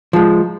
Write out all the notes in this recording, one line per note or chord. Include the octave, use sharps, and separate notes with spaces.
F3 G#3